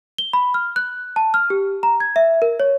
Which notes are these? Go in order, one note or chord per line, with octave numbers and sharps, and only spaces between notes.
G7
B5
F6
F#6
A5
F6
G4
A#5
G#6
E5
A#4
C#5